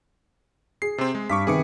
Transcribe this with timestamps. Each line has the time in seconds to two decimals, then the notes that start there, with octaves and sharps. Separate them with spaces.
0.82 G#4 C7
0.98 C3 C4
1.15 G#3
1.30 G2 C#6 D6 B6
1.47 C3 D#3 B3 G#4 D6 C#7